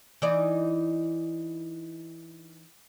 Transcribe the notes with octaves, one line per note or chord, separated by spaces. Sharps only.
E3 D#4 D5